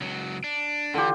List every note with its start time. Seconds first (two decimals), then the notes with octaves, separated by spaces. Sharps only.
0.01 C#2 F#3
0.44 D4
0.94 D3 E3 F4 G4